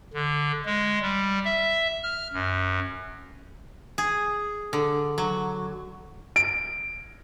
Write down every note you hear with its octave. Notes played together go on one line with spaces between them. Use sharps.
D3
G#3
G3
E5
F6
F#2
G#4
D3
F#3
D7